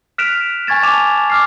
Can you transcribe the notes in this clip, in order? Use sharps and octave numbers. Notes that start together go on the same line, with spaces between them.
F6 F#6 B6 D7 E7 F7
G#5 C#6 G#6 A6 E7
G#5 A5 D6 E7 F7
D6 F6 C7